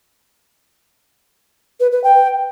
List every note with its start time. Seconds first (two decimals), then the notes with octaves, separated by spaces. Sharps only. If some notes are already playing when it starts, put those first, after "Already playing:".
1.80 B4
1.92 B4
2.04 G5